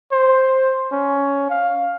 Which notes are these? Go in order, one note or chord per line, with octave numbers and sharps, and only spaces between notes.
C5
C#4
F5